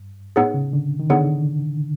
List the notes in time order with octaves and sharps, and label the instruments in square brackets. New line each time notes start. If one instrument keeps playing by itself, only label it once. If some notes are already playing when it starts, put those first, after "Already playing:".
Already playing: [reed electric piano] G2
[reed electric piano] A2 [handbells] B3 D#4 G#4 C#5 F#5
[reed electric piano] C#3
D3
D#3
[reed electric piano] D3 [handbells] B3 D#4 G#4 C#5 F#5